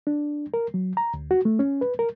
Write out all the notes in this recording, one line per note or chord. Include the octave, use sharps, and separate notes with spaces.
D4
A#4
F#3
A#5
D2
F#4
A3
C#4
B4
A#4